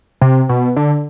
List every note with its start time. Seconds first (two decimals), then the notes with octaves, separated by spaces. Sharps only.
0.21 C3
0.49 B2
0.76 D3